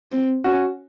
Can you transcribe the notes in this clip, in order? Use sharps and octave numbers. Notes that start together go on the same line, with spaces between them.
C4
C#4 F#4